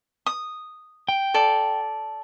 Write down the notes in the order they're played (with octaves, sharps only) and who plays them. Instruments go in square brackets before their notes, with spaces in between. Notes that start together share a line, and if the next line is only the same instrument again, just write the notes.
[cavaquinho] D#6
[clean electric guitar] G5
[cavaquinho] A4 D5